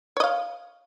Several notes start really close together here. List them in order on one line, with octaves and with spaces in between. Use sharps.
C#5 D#5 F5